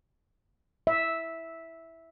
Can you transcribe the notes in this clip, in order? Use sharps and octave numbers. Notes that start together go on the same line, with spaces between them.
E5